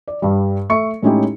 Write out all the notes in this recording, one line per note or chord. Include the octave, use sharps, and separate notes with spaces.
D5
G2 G3
A3 E5 C#6 C#7
A2 G#3 C#4 D#4 E4 G4